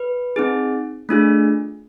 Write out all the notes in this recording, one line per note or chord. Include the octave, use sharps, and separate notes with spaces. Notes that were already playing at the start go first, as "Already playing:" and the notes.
Already playing: B4
C4 D#4 G#4
A3 D4 F4 G#4